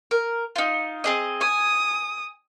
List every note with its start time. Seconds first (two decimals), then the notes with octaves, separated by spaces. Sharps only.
0.11 A#4
0.56 D#4 F4
1.04 C4 G#4 D#5
1.41 G#5 D#6